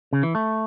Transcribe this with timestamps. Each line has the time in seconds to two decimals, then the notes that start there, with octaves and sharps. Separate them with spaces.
0.13 C#3
0.23 E3
0.35 A3